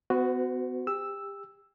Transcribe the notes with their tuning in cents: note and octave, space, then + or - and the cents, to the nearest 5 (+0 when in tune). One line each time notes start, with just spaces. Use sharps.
B3 +35 F#4 +0 C5 -35
G4 +30 E6 +0